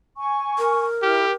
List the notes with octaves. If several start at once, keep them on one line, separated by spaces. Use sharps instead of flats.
G#5 C#6
A#4
E4 G4 F6